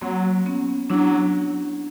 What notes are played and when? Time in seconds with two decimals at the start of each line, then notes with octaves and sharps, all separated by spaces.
0.01 F#3 A#3 C4
0.46 B3 C#4
0.90 F#3 D4 E4